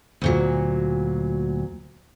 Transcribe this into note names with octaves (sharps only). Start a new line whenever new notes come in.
D2 A#2 F#3